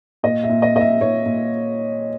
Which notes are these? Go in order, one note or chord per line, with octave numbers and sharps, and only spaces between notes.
A#2 D#5
E5
A#2
D#5
A#2 D#5
E5
A#2 C#5
A#2